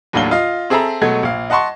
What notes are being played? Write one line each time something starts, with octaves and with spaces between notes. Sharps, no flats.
D#2 A2 F#3 D4 F5 G7
F4 D#5 F5
C4 G#4 A4 E5 A5 A#5
B2 F#3 G#3 A3 G#6
A#1 F5
D#5 F#5 A5 C6 C#6